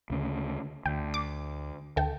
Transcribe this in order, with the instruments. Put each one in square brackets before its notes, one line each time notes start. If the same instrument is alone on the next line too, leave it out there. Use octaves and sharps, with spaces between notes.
[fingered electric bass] D2 C#3
[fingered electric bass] D2 [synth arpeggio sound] G5
[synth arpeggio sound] D6
D2 A4 G5